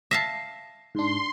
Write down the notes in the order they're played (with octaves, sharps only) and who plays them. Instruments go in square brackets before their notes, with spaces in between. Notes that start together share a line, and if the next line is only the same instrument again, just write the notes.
[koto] E5 F5 A5 [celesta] A#6 C7
[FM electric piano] G#2 D4 [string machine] C6